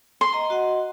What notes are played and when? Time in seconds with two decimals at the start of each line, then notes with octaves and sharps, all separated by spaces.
0.21 C6
0.32 D#5 A#5
0.50 F#4 D#5 F#5